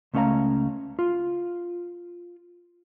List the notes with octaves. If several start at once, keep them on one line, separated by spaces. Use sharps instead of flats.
C#2 A3 C#4 C#5 F5 A#5
F4